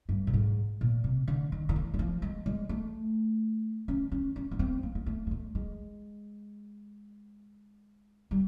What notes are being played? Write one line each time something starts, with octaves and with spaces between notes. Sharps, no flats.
G2
A2
G#2
A#2
C3
D3
D#3
D#3
E3
F#3
F3
G#3
G#3
A3
C#4
C#4
C#4
B3
C4
A#3
A#3
A3
G#3
A3
G#3
G3